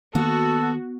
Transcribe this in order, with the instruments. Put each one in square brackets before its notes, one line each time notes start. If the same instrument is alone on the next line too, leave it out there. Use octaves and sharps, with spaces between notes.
[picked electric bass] D#3 A#3 [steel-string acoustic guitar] B3 [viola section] F#4 [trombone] A4